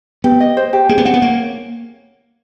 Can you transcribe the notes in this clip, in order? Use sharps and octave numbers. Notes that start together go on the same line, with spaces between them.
B3 G4
D#5
C5
G4
A#3 G#4
B3
C4 F#5
B3
A#3 C#5